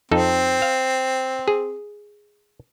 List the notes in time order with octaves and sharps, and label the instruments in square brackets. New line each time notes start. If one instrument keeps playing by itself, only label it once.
[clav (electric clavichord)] F2 D#4 A4 [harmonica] C4
[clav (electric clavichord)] F5
G#4